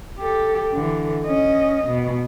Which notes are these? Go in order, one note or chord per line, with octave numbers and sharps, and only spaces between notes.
G4 A4
D3 E3
C#4 D#5
B2